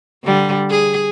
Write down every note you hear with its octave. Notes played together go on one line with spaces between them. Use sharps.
D3 G3
G#4